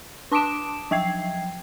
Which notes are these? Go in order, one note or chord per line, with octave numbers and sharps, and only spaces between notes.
D4 A5 D6 D#6 D7 E7
F3 F#3 G5 G#6 C7